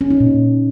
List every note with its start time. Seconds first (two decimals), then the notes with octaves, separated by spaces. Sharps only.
0.01 C#4
0.10 D#4
0.20 A#2